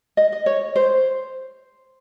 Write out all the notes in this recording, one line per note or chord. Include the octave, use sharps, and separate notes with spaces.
D#5
D#5
C#5
C5